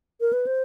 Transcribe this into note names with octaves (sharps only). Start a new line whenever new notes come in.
A#4
B4
C5